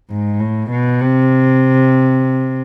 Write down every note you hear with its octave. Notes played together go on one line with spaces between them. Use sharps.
G#2
A2
B2
C3